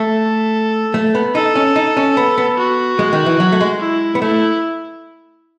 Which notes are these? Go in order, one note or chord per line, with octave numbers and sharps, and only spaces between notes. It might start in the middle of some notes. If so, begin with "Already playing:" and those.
Already playing: A3 A4
A3
B3
D#4 A4
C#4
D#4
C#4
B3
B3
F#4
G#3
D#3
E3
F#3
A3
G#3
E4
B3
A3 E4